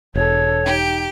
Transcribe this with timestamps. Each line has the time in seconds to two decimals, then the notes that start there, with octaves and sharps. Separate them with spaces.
0.15 E1 D4 A4 C#5
0.65 D#4 G4 G5